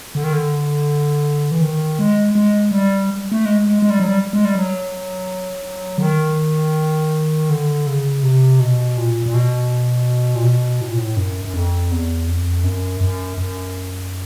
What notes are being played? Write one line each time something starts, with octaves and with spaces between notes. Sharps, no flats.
D3
D#3
D3
E3
D#3
G#3
G#3
G3
A3
G#3
G#3
G3
F#3
G3
G#3
G3
F#3
D3
D#3
D3
C#3
C3
B2
A#2
A#2
B2
A#2
B2
A2
A#2
A2
F#2
F#2
F2
E2
F2
F#2
F#2
F#2